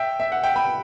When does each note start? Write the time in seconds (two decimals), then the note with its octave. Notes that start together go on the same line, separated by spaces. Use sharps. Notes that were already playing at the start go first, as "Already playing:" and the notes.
Already playing: E5 G5
0.20 E5
0.32 F#5
0.43 E5 G5
0.56 G5 B5